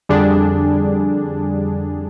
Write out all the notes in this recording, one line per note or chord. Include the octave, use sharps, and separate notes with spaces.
F2 D3 G3 D4 G#4